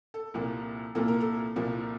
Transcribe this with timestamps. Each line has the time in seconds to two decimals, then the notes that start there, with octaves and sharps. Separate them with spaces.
0.14 A4
0.34 C2 A#2 F3 A#3
0.95 C2 A#2 F3 A#3 A4
1.08 A#4
1.21 A4
1.56 C2 A#2 F3 A#3